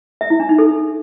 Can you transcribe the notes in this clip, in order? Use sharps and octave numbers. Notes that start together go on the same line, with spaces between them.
E5
E4
D4
D#4
A4